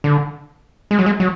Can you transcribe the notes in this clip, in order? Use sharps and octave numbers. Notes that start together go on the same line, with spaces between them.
D3
G#3
F#3
G#3
F#3